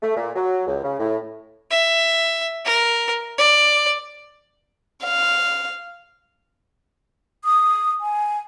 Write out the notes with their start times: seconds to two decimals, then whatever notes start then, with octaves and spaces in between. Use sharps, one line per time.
0.03 A3
0.16 A#2
0.35 F#3
0.67 C#2
0.84 C#3
0.99 A2
1.71 E5
2.65 A#4
3.38 D5
5.04 F5
7.45 D#6
8.01 G#5